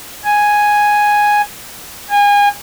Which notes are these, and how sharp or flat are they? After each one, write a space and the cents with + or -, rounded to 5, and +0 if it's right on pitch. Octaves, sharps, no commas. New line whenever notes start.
G#5 +0
G#5 -30